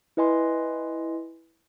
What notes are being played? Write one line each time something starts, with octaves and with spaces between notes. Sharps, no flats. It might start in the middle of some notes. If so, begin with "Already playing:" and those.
E4 B4 D#5 G#5 C6